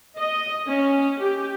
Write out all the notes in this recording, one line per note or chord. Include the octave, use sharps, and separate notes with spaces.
D#5
C#4
G4